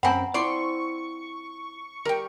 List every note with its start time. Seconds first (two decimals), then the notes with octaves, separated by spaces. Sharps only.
0.03 F#2 C4 F#5 G#5 A#5 B5
0.34 C4 E4 F4 D5 C6 C#6
2.05 G3 A#4 G5